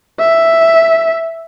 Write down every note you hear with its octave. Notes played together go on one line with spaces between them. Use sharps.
E5